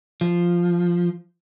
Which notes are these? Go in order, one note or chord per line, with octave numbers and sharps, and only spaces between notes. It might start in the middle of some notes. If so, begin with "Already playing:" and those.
F3